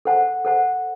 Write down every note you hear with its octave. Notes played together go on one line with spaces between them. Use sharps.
A4 C5 F#5 A5
A4 C5 F#5 A5